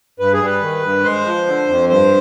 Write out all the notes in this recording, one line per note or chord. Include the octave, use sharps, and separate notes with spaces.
G2 B4
G#4
G3 B4
D#3
G2
G#3 C5
F3
D3
F2
G2 C5